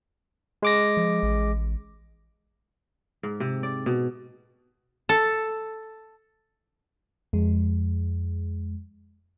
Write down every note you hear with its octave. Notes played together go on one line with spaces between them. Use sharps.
G#3 D6 A#6
F3
A1
G#2
C3
D5
B2
A4
F2 G#3